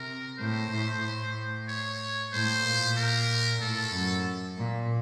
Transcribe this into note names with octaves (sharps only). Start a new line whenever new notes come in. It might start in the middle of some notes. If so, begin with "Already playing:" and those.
Already playing: C3 A#4
A2 C5
A2
A2
C#5
A2 C5
A#2
A#4
A2 A4
F#2
A#2